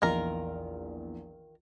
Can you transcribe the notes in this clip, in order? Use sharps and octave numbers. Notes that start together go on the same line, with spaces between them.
A#1 E2 D#3 F4 A#4